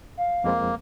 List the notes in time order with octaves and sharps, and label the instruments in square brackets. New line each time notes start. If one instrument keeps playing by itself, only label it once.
[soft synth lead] F5
[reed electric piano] F2 G#3 C4 [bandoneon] A#3